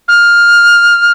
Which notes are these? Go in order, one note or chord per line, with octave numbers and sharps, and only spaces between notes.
F6